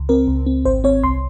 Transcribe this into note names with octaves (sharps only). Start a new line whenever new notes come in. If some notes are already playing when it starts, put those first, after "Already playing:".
Already playing: C#2
C4 A#4
C#2
C4
G#1 C5
C4 C#5
C2 C6